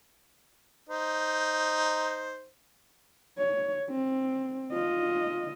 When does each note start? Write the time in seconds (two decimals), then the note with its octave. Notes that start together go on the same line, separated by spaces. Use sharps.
0.90 D#4 C5
3.38 C#5
3.89 C4
4.72 F4 D#5